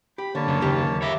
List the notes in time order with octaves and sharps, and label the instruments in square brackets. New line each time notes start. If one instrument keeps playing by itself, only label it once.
[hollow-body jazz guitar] G4 [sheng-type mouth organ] B5
[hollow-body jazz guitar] D3 [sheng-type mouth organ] A#3 C#5 A5
[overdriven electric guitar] F#2 C#3
[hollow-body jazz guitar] D#2 D#3 G4
[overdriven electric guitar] C#5 E5 [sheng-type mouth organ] B5 D6 E6